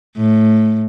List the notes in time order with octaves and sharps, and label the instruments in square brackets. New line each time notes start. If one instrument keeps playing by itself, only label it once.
[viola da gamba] A2